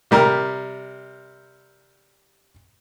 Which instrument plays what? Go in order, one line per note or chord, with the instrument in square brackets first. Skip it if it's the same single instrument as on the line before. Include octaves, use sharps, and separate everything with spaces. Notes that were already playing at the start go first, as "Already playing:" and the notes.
[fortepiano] C3 G3 A#4